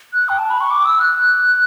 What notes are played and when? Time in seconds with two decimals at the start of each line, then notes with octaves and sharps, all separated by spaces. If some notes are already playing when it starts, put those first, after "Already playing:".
0.13 F#6
0.29 G5
0.39 A5
0.50 B5
0.61 C#6
0.70 D6
0.85 E6
1.00 F#6